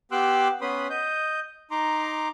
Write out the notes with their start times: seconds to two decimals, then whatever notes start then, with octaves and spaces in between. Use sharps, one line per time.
0.12 B3 G4 C6 D6 E6 F#6
0.61 B3 C#4 B4 B5 C6 D#6
0.90 D#5 G6
1.71 D#4 A#5 C6 D6